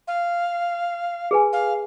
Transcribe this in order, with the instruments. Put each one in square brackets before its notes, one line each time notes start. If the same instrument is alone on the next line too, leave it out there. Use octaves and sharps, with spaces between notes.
[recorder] F5
[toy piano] G#4 B4 G#5
[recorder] F5